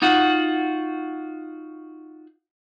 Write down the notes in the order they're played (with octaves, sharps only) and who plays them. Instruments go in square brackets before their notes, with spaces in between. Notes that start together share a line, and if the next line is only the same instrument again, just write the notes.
[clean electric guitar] D#4 F4 F#4 F#5